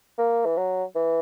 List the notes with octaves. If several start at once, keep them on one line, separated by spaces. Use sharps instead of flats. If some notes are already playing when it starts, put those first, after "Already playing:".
A#3
E3
F#3
E3